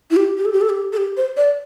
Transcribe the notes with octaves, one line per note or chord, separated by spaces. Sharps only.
E4
G4
G4
A4
G4
A4
G4
A4
G4
C5
D5